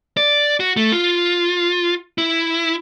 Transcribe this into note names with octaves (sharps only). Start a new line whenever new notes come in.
D5
F#4
A3
F4
E4